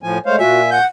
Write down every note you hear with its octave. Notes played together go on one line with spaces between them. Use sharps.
A2 F3 G#5
G#3 A3 C5 C#5 F5
A#2 F4 F#4 E5 G#5
F#5 G6